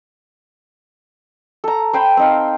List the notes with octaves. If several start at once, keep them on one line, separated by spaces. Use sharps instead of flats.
A4 A#5
C5 G5 B5 C6
C4 D#4 F5